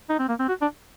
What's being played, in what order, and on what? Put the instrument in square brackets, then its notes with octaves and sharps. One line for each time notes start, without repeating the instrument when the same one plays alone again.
[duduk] D#4
C4
A#3
C4
F#4
D4